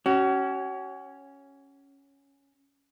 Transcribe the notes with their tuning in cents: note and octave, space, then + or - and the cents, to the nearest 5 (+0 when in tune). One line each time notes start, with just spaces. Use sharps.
C#4 +0 F#4 +35